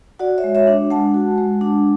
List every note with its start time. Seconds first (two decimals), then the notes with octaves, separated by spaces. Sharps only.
0.19 F#4 D5 F#5
0.38 C#5 E5
0.44 G#3
0.55 C#5 E5
0.67 D4
0.90 G#3 F#5 A5
1.14 F#4
1.38 G#3
1.61 D4